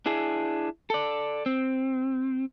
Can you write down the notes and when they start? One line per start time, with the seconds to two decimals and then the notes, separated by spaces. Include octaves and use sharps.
0.06 D4 E4 G#4
0.90 A4 D5
1.46 C4